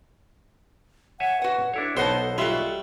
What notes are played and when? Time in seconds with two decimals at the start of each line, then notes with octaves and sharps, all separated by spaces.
1.20 C#5 E5 F#5 G#5
1.42 F#4 B4 F#5
1.74 D4 E4 A4 C#5
1.97 B1 B3 D#4 C5 F#5 A5
2.38 G3 F4 F#4 E5